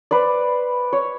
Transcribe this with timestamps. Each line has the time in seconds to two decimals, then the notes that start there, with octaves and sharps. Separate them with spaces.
0.11 B4 C5 D5
0.93 C#5